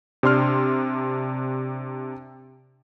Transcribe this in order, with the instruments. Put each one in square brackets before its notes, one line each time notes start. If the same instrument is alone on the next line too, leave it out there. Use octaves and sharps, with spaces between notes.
[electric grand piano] C3 D4 C6 F6